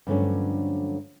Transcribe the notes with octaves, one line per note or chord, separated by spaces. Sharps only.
G2 D3 F3 F#3 A3 C#4